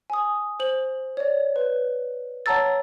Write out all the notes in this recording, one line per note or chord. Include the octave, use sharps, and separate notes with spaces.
G#5 D#6
C5 F#7
C#5 D5
B4
C#5 F#5 A5 A#5 E6 A6